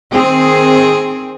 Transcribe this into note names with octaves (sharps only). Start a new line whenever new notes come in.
D#3 C4 G#4